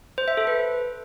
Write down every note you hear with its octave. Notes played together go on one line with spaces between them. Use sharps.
C5
E5
A4
B4